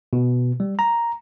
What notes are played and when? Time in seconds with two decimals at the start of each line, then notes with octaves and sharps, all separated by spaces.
0.13 B2
0.60 G3
0.79 A#5